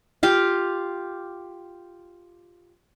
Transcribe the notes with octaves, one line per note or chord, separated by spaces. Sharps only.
F4 G4 F5